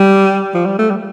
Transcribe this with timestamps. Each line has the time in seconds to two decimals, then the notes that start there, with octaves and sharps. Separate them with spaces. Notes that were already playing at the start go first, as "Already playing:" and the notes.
Already playing: G3
0.54 F3
0.65 G3
0.79 A3
0.90 G3